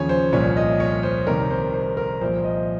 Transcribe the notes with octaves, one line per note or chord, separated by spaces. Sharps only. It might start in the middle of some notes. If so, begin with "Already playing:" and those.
Already playing: D#2 C#3 F3 C#5 G#5
C5
C2 A#2 F3 C#5
D#5
C#5
C5
C2 C3 D#3 A#4
C5
C5
A#4
C2 A#2 F3 C5
D#5